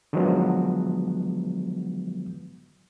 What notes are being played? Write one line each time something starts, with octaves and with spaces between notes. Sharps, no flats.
D3 D#3 F3 F#3 G#3 B3